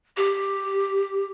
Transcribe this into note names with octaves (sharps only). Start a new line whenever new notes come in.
G4